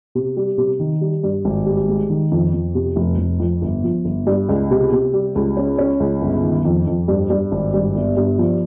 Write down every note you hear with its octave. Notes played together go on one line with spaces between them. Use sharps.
C3
G3
C3
D#3
G3
G2
G#1
G3
G#3
D#3
F2
F2
C3
F1
F1
F2
G1
F3
G1
G2
C#2
C3
C3
G3
C#2
C#4
C#4
C#2
G1
D#3
F2
F2
G2
G2
G#1
G2
G1
G2
F3